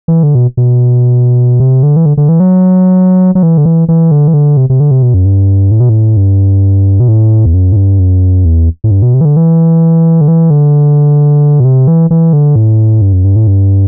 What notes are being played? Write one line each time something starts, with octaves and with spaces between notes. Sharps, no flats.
E3
D3
B2
B2
C3
D3
E3
D3
D3
E3
F#3
F#3
E3
D3
E3
E3
D3
E3
D3
C3
C3
D3
C3
B2
F#2
G2
A2
B2
A2
G2
B2
A2
E2
F#2
A2
G2
F#2
E2
A2
G2
B2
C3
E3
D3
E3
D3
E3
D3
B2
C3
E3
E3
D3
A2
G2
F#2
G2
A2
G2